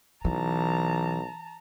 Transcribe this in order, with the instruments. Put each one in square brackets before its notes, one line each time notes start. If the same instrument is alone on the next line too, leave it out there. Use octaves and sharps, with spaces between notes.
[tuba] B1 [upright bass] E3 [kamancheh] A5 A#5